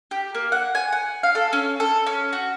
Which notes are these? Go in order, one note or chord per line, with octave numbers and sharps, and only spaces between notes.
G4
A#3
F#5
G#5
F#5
F5
A4
C#4
A4
C#4
F#4